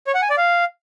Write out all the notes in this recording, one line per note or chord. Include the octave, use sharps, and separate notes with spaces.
C#5
F#5
G#5
D5
F5